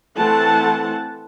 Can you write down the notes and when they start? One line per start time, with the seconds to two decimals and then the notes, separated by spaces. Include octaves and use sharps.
0.17 E3 A3 C4 E4 F#5 A5